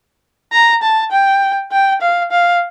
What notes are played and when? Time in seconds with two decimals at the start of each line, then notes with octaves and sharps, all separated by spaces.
0.53 A#5
0.83 A5
1.12 G5
1.72 G5
2.02 F5
2.32 F5